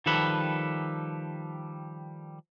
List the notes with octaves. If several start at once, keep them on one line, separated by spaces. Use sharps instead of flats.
D#3 F3 G3 A4 B4